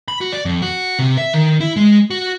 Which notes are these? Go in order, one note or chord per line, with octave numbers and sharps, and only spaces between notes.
B5
F#4
D5
F2
F#4
C3
E5
D#3
E4
G#3
F#4